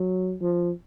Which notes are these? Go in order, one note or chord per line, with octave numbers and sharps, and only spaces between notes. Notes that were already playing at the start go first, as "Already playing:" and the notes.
Already playing: F#3
F3